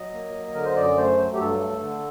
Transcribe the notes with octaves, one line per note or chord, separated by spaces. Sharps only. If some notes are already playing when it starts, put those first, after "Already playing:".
Already playing: F#3 D#5
A#3
F#3
D3 A#4
C5
F#2 D5
A3 C5
F#3
G4
G2 A4
A3
D3